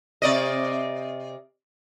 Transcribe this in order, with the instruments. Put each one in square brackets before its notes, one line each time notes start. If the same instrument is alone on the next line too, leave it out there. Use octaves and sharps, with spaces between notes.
[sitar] C3 D5 D#5